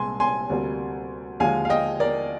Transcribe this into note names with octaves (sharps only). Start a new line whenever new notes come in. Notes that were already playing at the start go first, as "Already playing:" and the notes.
Already playing: C2 A#2 G#3 G#5 C6
G#5 C6
D2 C3 G3 A#3
D#2 D3 F3 G#3 F5 G#5
F5
D#5 G5
A#4 D5